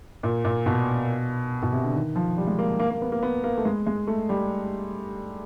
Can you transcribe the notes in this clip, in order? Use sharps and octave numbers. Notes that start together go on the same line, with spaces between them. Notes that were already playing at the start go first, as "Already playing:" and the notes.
A#2
A#2
B2
B2
C3
D3
D#3
F3
G3
G#3
A#3
A#3
A#3
B3
A#3
B3
A#3
A3
G#3
G#3
A3
G3